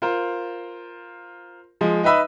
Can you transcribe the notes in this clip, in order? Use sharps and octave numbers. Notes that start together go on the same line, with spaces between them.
F4 A#4 C5
F3 G#3
D#4 B4 D#5 E5 B5